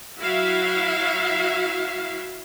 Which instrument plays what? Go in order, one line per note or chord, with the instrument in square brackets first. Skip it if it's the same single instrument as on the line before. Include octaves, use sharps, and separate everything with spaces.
[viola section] F#3 E4 F#4 E5 F5